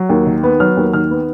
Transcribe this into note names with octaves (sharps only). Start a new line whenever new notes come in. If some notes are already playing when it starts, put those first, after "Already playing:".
Already playing: F#3
D#2
D#3
B3
F#3 F6
D#2
D#3 F6
B3